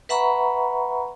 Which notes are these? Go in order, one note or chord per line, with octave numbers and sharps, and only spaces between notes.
B4 E5 F#5 A#5 B5 C#6